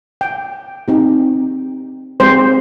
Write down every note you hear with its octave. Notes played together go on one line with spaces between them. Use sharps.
G5
C4 D#4 G4
G#3 C4 G4 C5